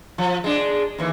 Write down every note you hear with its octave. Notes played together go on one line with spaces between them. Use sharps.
F3
G#3 D4
D#2 E3